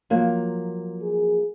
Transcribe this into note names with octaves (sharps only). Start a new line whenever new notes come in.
F3 F#3 A#3
G#4